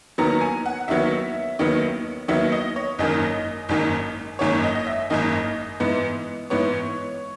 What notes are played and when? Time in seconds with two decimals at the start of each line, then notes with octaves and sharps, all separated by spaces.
0.18 D#2 D#3 F#3 B3 A#5
0.41 G#5
0.66 F#5
0.88 D#2 D#3 F#3 B3 E5
1.59 D#2 D#3 F#3 B3
2.28 D#2 D#3 F#3 B3 E5
2.52 D#5
2.76 C#5
2.99 G#1 F#2 D#3 A#3 D#5
3.69 G#1 F#2 D#3 A#3
4.39 G#1 F#2 D#3 A#3 C#5
4.64 D#5
4.75 D#5
4.87 E5
5.10 G#1 F#2 D#3 A#3 D#5
5.80 G#2 E3 B3
6.50 G#2 E3 B3 C#5